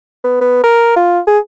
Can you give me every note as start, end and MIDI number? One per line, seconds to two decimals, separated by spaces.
0.24 0.40 59
0.41 0.61 59
0.64 0.92 70
0.96 1.20 65
1.27 1.38 68